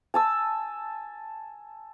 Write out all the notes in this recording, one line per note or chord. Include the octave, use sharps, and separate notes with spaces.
G#5 A5 E6